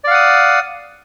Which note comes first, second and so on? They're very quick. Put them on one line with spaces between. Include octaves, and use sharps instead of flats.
D5 F5 F#5 D#6